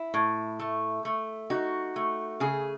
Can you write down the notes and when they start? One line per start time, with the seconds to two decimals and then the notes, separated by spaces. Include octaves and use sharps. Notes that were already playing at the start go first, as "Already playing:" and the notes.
Already playing: E4
0.14 A2
0.59 A3
1.05 A3
1.50 D#4 F#4
1.96 A3
2.40 C#3 G#4